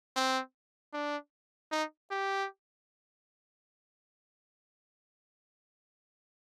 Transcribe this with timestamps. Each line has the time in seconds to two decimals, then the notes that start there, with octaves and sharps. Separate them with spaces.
0.16 C4
0.93 D4
1.72 D#4
2.11 G4